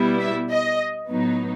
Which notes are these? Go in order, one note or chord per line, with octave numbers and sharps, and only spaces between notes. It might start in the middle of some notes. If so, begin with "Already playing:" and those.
Already playing: B2 G3 B3 E4
E5
D#5
A2 F#3 B3 D#4